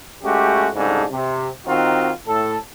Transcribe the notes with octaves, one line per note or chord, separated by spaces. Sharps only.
G#3 A3 C#4 F#4 G4
C2 G#2 C#3 D4 D#4 A4
C3
D#3 C4 D#4 F4 F#4
A2 A4